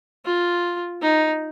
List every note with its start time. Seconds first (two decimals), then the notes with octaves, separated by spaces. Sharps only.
0.25 F4
1.02 D#4